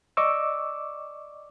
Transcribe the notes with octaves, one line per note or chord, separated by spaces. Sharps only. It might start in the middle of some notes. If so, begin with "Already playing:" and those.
D5 D#5 C#6 D6 E6